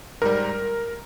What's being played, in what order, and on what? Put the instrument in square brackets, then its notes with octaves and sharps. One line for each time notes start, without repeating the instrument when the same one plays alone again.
[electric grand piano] G#2 G3 A#4